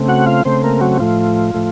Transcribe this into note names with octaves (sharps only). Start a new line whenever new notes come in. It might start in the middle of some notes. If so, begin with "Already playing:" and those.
Already playing: C#3 A3 C4
F#4 F#5
F4 F5
C#3 A3 C4 C5
A#3 A#4
F#3 F#4
A2 F3 A3 F4
A2 F3 A3